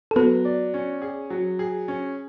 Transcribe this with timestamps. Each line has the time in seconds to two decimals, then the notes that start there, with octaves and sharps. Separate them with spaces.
0.11 A4
0.16 F#3 B3 B4
0.45 D5
0.74 C#4
1.02 G#4
1.30 F#3
1.59 G#4
1.88 C#4